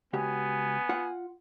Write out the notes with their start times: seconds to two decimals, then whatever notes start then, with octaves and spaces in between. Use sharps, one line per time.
0.13 C#2 B3 F#4 G4 G#5
0.89 F4 F#5